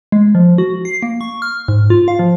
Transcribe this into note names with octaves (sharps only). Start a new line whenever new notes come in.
G#3
F3
F#4
C7
A#3
C#6
F6
G#2
F4
F5
F3